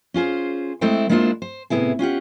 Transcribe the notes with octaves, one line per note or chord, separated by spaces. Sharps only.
C#4 F4 G#4 C5
G#3 A3 C4 E4 C5 G5
G#3 A#3 D4 E4 F4 C5
C5
A2 C3 B3 E4 G#4
C#4 F4 G4 F#5